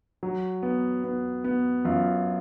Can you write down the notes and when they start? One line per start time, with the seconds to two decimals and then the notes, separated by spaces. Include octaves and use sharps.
0.23 F#3
0.63 B3
1.04 B3
1.44 B3
1.85 F#2 F4